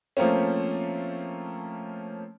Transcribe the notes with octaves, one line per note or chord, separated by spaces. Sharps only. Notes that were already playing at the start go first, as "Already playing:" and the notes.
F3 A3 A#3 C4 C#4